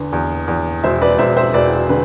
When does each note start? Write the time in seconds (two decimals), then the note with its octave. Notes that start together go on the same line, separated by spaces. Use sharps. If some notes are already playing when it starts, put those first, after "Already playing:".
Already playing: E2 D3 B4
0.13 E2
0.48 E2
0.83 E1 C5 E5
1.02 B4 D5
1.19 E1 C5 E5
1.37 C5 E5
1.54 E1 B4 D5
1.89 D3 B4